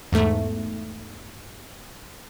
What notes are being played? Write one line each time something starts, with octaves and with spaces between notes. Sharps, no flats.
E2 G#2 A3